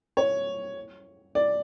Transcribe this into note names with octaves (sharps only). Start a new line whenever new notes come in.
C#5
D5